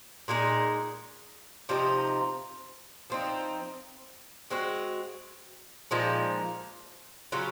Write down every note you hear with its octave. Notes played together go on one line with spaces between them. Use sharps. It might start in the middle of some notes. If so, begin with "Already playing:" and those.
A#2 G#3 D#4 G#4
C3 F3 C4 D#4
F3 C4 D#4
G#3 C4 F#4
A#2 F3 G#3 D#4
C#3 F#3 C#4 F4